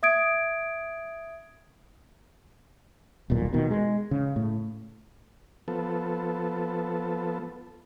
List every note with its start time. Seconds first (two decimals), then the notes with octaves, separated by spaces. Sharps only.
0.03 E5 D#6 G#6 D7
3.30 D#1 B1 A#2
3.53 B2 D#3
3.71 G#3
4.11 C#3
4.36 A2
5.68 F3 B3 A4